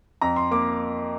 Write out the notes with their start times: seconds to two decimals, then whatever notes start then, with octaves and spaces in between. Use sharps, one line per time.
0.21 F2 A#5
0.36 C6
0.51 A#3 D6